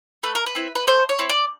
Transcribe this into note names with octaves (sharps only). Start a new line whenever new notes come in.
A3 B4
A#4
B4
C4 E4
B4
A3 C5
C#5
C4 E4
D5